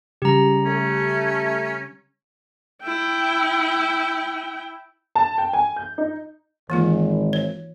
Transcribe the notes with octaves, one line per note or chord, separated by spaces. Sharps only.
C#3 G3 G4 A#5
A3 C#4
E4 G5
A5
G5
G#5
G6
D#4
G#1 E3 A#3 F4
C#5